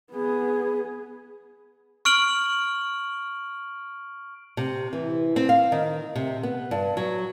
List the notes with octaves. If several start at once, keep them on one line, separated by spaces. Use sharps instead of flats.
B3 G#4
C#6 F6 D7 F#7
C3
E3
C4
F5
D#3
C3
B3
G2
F#3